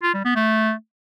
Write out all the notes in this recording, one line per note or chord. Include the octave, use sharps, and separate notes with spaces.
F4
G3
B3
A3